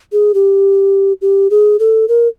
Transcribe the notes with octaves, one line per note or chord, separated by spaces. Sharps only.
G#4
G4
G4
G#4
A4
A#4